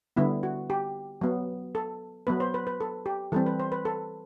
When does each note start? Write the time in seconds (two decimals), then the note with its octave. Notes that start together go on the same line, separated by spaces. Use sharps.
0.16 D3 G3 B3 E4
0.43 F#4
0.70 G4
1.21 F#3 B3
1.75 A4
2.27 F#3 B3 B4
2.40 C5
2.54 B4
2.67 B4
2.81 A4
3.06 G4
3.32 E3 G3 C4 A4
3.46 B4
3.60 C5
3.72 B4
3.85 A4